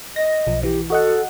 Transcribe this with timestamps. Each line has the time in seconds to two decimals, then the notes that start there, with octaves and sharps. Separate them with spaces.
0.16 D#5 A#6
0.47 B1 F3
0.63 E3 G4
0.90 F#4 A4 D#5 F#5